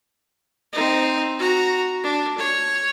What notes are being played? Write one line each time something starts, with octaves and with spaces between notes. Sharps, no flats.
C4 D#4
F#4 A#5
D4
C#5